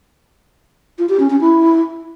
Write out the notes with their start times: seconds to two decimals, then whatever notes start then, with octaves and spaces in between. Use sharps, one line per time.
0.99 F4
1.09 G4
1.20 C#4
1.30 C#4
1.41 E4